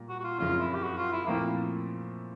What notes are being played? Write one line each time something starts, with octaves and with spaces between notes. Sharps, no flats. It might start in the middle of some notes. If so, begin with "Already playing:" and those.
Already playing: A#2 G3 A#3
F#4
F#4
F4
F#1 F2 C#3 F4
E4
G4
F#4
F4
E4
A#2 F3 A3 A#3 C4 E4